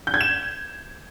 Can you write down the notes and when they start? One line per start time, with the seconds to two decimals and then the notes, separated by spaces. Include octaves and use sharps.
0.07 G6
0.14 G#6
0.21 E7